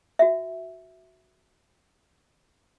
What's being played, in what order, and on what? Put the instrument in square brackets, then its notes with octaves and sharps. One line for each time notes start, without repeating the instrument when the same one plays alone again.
[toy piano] F#4 E5